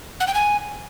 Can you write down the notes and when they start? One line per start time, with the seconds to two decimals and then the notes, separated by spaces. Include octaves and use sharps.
0.20 F#5
0.27 G5
0.34 G#5